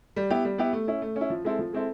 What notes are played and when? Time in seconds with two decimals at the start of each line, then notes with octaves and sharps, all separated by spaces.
0.16 G3
0.30 B3 E4 G4
0.45 G3
0.58 B3 E4 G4
0.73 A3
0.87 C#4 E4
1.02 A3
1.16 C#4
1.21 E4
1.30 F3
1.45 G#3 C4 E4 A4
1.59 F3
1.73 G#3 C4 E4 A4